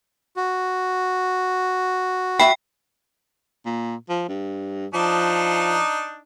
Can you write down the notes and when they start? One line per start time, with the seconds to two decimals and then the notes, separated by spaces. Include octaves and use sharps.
0.37 F#4
2.39 E5 G5 B5
3.66 A#2
4.09 F3
4.29 G2
4.94 F3 D4 D#4